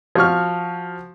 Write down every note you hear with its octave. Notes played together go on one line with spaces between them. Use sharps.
F3 F#4 C#6 F6